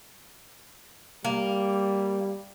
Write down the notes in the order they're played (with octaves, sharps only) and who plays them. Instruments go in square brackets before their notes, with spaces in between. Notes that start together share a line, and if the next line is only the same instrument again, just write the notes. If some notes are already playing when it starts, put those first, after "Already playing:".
[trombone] G3 [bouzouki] A#3